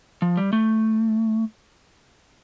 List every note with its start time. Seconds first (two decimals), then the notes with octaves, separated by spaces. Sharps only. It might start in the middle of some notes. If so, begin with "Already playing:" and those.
0.22 F3
0.37 G3
0.53 A3